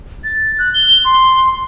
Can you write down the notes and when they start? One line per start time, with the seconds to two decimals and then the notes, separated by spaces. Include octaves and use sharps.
0.24 A6
0.59 F#6
0.74 G7
1.05 C6